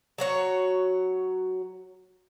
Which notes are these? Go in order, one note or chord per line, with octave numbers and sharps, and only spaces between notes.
F#3 F#4 C#5